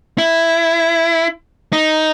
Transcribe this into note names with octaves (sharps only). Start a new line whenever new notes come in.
E4
D#4